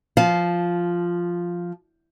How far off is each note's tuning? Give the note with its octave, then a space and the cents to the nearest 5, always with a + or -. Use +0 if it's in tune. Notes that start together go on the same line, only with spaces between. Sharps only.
F3 +0 F5 +0 A5 -30